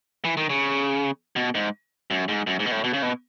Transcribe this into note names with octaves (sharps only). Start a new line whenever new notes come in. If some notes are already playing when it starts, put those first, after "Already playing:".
E3
D#3
C#3
B2
G#2
F#2
G#2
F#2
G#2
B2
A2
B2
C#3
B2